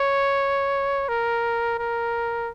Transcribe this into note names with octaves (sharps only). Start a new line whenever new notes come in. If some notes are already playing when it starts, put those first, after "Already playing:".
Already playing: C#5
A#4
A#4